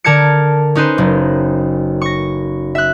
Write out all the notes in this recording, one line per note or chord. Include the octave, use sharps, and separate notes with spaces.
D3 A#4 A5 G#6 C#7
C#4 D#4 B4 C5
F#1
C#6 A#6
E5 F#6